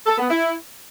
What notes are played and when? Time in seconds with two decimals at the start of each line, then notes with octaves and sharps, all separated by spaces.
0.06 A4
0.18 B3
0.29 E4